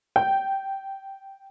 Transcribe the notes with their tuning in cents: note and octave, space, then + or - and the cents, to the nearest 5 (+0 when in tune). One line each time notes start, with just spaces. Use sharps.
G5 -10